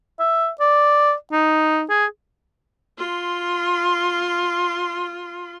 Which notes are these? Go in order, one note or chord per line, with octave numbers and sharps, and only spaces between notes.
E5
D5
D#4
G#4
F4 C6